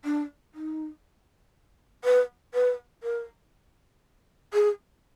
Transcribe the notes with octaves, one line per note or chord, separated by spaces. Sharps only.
D4
D#4
B4
B4
A#4
G#4